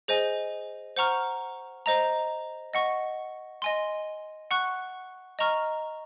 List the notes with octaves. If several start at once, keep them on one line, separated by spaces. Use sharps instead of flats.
G#4 C5 D#5 G#5
C5 F#5 A#5 C#6 F6
C5 D#5 A#5
D#5 F#5 C#6
D#5 G#5 C6
F#5 C#6 F#6
D#5 A#5 C#6 F6